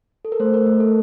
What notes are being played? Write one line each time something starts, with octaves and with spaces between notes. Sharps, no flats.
A4
A#4
A3 C5
A#4
A3
A4